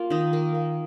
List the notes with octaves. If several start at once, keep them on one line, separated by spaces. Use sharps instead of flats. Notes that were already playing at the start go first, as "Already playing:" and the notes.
Already playing: A#3 F4
D#3 D#4
A#3
A#3